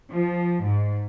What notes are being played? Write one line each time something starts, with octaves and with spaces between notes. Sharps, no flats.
F3
G#2